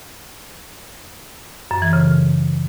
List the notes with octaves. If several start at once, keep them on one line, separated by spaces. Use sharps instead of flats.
F#2
E3
C#3